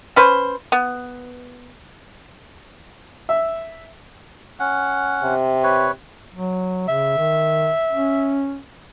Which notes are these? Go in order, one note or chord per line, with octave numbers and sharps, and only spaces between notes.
C#4 B4 C5
B3
E5
C#4 F#5
C3
B4 C#5
F#3
C#3 E5
D#3
C#4